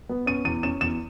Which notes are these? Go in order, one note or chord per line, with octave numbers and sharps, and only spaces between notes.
B3
C#4 D#7
E2 D#7
C#4 E7
E2 E7